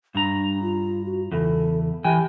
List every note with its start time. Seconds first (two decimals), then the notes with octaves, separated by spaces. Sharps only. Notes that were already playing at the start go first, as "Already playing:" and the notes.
0.15 G2 D4 A#5
0.62 F4
1.06 F#4
1.32 E2 C#3 A4
2.04 E3 G4 G5 G#5